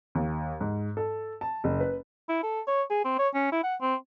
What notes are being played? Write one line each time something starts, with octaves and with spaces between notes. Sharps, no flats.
D#2
G#2
A4
A5
F#1
B4
E4
A4
C#5
G#4
C4
C#5
C#4
E4
F#5
C4